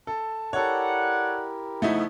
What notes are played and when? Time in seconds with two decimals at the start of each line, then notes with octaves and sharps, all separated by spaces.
0.07 A4 A5
0.53 E4 G4 A4 A#4 C#5 D5 F#5
1.82 C#3 F3 A3 B3 D#4 E4 E5